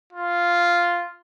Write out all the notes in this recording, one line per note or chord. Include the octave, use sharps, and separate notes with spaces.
F4